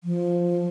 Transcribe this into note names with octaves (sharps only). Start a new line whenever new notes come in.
F3